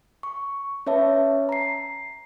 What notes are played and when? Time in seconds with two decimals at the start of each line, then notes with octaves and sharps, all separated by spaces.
0.23 C#6
0.87 C#4 B4 C#5 E5 A5
1.49 A#5 C7